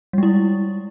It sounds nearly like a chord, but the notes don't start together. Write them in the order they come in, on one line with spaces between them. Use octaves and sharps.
G3 G#3 E4